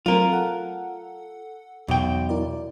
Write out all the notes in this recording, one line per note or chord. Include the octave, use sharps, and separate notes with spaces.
F#3 A3 C4 F4 A#4
A4 F#5
B1 E2 B2 G5
E4 A#4 D5